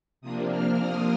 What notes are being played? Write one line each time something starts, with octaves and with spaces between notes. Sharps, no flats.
C3 F3 A#3 D4 D#6
F6
D#6